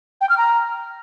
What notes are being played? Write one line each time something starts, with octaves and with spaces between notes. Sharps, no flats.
G5
F6
A#5